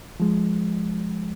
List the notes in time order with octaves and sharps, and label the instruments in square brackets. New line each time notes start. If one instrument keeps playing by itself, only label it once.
[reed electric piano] F3 G#3